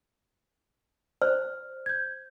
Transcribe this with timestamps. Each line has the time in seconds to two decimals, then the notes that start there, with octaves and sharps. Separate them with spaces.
1.22 C5 D5 F6
1.86 G6 G#6